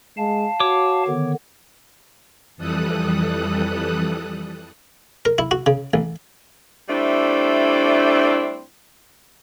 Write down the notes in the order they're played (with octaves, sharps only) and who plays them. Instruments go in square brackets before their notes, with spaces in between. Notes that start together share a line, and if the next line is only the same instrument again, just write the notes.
[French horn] G#3 [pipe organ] F5 A5
[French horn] F#4 [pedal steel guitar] C#5 D6
[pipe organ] D3 D#3 B3
[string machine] F2 E3 G3 A4 D#6 F#6
[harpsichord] A#4
E4
F#4
C#3
A1
[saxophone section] G3 A3 C4 D4 E4